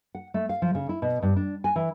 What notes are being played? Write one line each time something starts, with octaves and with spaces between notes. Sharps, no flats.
F#5
A3
F5
F3
C#3
E4
B2
G2
D4
G#5
E3